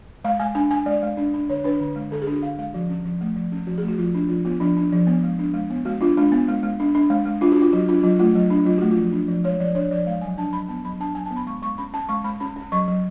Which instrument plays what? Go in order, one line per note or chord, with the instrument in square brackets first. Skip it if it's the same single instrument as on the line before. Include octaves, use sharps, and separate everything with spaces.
[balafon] G#3 F5
G#3 G#5
D4 G#5
D4 G#5
G#3 D5
G#3
D4
D4
D3 C#5
D4 B4
D3
G#3
D3 A4
G#4
D4 F#4
D3 F5
G#3 F5
F3 F#4
C#4
F3
A3
F3
C#4
F3 F#4
G#4
A3
F#4
F3 F4
D4
F3 F4
B3 F4
F3 D4
D4
F3
B3
G#3
D4
G#3
B3
G#3 F#4
D4 F4
G#3 D4
B3
G#3
G#3
D4
D4
G#3
G#3
D4 F4
F#4
D4
F4
F#3 F#4
D4 F4
F#3 F4
A3 F4
F#3 F4
D4
F#3 F4
A3 F#4
F4
F3
D4
F3
G#3 C#5
F3 D5
D4 C#5
F3 D5
G#3 F5
F#3 G#5
D4 A5
F#3 B5
B3 A5
F#3 B5
D4 A5
F#3 G#5
A5
B3
B5
G#3 C#6
G#3 C#6
C#4 B5
C#4 A5
G#3 C#6
G#3 B5
C#4 B5
C#4
F#3 C#6
F#3